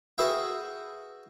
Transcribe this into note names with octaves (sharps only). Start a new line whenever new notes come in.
F#4 G#4 B4 E5 F5 G5